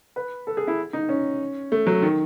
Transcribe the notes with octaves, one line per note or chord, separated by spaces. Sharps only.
B4
A4
G#4
E4
D#4
C#4
A3
F#3
D#3